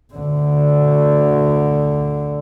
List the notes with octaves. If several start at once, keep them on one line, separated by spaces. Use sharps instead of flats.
D2 D3